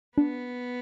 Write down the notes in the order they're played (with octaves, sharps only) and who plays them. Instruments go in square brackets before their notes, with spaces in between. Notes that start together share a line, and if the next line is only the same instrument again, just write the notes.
[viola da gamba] B3 [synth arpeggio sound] D4